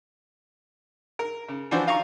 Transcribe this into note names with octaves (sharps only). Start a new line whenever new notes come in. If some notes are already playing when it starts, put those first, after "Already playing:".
A#4
C#3
E3 F3 D4 F#4 C5
F4 F5 A#5 C#6